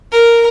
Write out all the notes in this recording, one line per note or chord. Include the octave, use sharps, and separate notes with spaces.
A#4